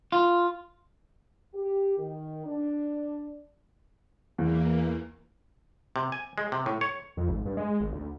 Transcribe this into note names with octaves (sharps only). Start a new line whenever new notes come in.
F4
G4
D#3
D4
E2 E3 A#3
C3
G#5
G#3
C3
A2
C#5
F2
G#1
G2
G#3
G#1
D2